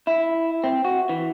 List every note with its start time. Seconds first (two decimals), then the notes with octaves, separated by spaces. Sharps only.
0.07 E4
0.64 C4
0.85 F#4
1.09 E3